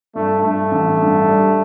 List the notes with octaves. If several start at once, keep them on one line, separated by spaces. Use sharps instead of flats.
G2 A3
G2 A3
A1
G2
G3